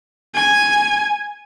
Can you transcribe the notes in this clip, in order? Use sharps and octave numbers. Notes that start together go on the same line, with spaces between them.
G#5